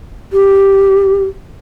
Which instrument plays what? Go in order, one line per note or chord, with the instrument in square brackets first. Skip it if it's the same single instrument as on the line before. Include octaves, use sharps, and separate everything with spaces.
[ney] G4